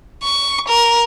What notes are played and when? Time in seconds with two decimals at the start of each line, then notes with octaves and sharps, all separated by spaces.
0.23 C#6
0.68 A#4